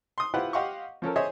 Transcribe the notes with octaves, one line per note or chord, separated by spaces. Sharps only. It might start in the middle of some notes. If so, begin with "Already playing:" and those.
C6 D#6
E4 F4 G4 B4 C5 F#5
G4 D#5 F5 F#5 C6 C#6
F3 C#4 A4 A#4
G#4 C5 C#5 D#5 E5